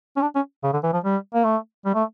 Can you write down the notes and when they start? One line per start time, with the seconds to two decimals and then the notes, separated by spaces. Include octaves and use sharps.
0.17 C#4
0.22 D4
0.35 C#4
0.63 C#3
0.73 D3
0.83 E3
0.93 F3
1.04 G3
1.34 A#3
1.44 A3
1.86 G3
1.95 A3